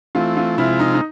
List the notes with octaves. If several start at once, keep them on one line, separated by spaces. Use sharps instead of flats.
E3 A3 C4 F4
F4
C3 F3 G#3 C4 E4 F4
D#4
D#4